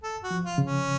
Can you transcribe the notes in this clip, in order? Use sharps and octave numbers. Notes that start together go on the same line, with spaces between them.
A4
F#4
F3
F4
C#3
C#4